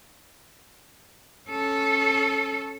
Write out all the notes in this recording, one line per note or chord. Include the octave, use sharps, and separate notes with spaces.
C#4 A4